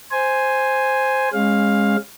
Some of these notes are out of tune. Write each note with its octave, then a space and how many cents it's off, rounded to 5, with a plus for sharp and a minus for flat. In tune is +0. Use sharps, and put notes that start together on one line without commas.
C5 +0 G#5 +0
G#3 -15 C#4 -30 F5 +10